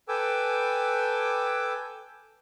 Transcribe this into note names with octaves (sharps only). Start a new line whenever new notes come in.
A4 B4 G5 G#5 D6 E6